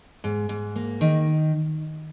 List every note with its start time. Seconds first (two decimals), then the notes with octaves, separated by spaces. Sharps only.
0.24 G#2
0.49 G#2
0.76 A#3
1.01 D#3